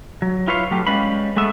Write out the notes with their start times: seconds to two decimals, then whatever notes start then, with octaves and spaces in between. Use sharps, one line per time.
0.22 F#3
0.47 E4 F4 B4 C#5 F5
0.71 F#3 A3 G4
0.87 G3 G#3 C#4 B4 F5 B5
1.36 G#3 A3 B3 E5